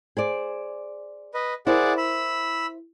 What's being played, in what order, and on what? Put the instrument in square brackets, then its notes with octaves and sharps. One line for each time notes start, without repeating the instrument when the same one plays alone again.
[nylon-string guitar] G#4 C5 D5
[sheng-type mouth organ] B4 D#5
[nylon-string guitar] E4 A#4 C5 [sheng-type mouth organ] G#4 D5 F#5
[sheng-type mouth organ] B5 E6